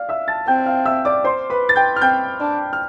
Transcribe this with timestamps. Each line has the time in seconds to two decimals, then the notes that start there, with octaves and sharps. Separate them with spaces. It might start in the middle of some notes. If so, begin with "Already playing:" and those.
Already playing: D5 F5 F6
0.09 E5 E6
0.28 A5 A6
0.47 C4 G5 G6
0.66 F5 F6
0.86 E5 E6
1.05 D5 D6
1.24 C5 C6
1.50 B4 B5
1.69 A6
1.76 G5 G6
1.96 F6
2.01 C4 G5 G6
2.40 D4
2.73 F6